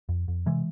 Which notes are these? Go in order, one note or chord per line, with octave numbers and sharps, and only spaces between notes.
F2
F2
C3 E3 G#3